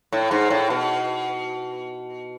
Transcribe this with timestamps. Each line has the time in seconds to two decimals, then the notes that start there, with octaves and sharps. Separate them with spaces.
0.13 A2
0.31 G#2
0.50 A2
0.70 B2